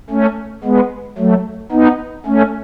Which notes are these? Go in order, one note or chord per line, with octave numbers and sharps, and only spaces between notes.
A3 C#4
G#3 B3
F#3 A3
B3 D#4
A3 C#4